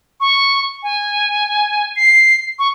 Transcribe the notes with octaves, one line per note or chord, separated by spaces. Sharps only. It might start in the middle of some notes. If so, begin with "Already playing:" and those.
C#6
G#5
C7
C#6